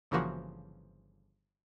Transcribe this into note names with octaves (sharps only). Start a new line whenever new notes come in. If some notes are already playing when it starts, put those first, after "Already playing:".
G1 C#3 E3 F3 A#3 F#4